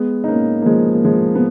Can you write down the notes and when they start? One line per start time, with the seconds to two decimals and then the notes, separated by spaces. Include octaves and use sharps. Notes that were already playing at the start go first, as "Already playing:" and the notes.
Already playing: G#3 B3
0.24 D#4
0.27 A#3 C#4
0.62 A#3
0.66 F3 G#3
0.93 A#3
1.04 F3 G#3
1.35 B3